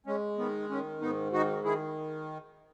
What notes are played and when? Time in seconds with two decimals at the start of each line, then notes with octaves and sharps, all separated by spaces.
0.06 G#3 C#4
0.38 D#3 B3
0.70 D#3 C#4
1.01 G#2 B3 D#4
1.32 D#3 D#4 F#4
1.64 D#3 E4 G#4